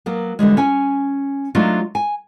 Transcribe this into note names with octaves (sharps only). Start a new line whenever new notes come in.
F#3 A#3 B3
D3 E3 G3 G#3
C#4 G#5
F#3 A3 D4 D#4 F4 F#4
G#5